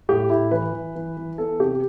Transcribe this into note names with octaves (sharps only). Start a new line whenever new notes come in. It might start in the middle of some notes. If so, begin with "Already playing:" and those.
A2 G4
A2 E4
E3 B4
E3
E3
E3
B3 A4
C3 G4